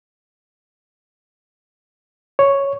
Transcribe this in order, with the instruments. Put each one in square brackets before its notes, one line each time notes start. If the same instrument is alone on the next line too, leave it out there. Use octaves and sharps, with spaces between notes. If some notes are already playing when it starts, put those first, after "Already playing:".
[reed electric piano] C#5